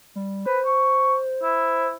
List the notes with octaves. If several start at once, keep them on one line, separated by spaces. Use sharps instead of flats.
G3
B4 C5
C#6
E4